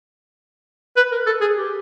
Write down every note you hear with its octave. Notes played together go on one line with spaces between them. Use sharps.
B4
A#4
A4
G#4
G4